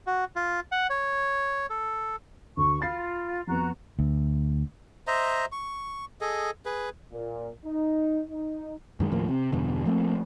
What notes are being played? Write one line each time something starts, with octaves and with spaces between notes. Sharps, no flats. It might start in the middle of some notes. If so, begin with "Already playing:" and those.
F#4
F4
F#5
C#5
A4
D2 C#6
F4 B5 A6 C7
F2 B3 F#4 A#5
D2
C5 D#5 E5 A#5
C#6
G#4 A4 D#5
G#4 B4
A#2
D#4
D#4
F#2 D#3 G#3
D#2 A2 F3 A#3
C3
E2 G2 B2 D3
F3 A3 A#3 C4